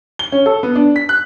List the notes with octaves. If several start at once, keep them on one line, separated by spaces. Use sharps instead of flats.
G7
C#4
A4
B3
D4
B6
F#6